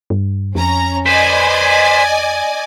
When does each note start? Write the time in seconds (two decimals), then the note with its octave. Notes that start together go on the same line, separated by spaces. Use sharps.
0.10 G2
0.55 F2 C#4 A#5
1.06 B4 C5 D5 D#5 G#5